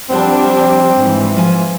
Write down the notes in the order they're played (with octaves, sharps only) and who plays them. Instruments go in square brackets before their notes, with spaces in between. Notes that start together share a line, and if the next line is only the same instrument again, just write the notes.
[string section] F3 G3 D4 [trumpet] C4 [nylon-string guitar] C5 F#5
[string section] G#2 E3
[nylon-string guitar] F3 G#5